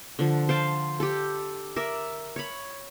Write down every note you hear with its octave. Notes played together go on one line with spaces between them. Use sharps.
D3 F3
C5 F5 G5 A5
G4 A4
A#4 D5 E5
C#5 B5